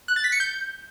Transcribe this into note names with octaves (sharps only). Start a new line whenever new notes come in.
F#6
A6
B6
C#7
G6